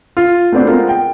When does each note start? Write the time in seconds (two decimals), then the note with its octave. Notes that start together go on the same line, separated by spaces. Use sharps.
0.17 F4
0.52 A3 B3 C4 D4 F#4
0.67 G#3 B3 C4 F4 A#4
0.89 G5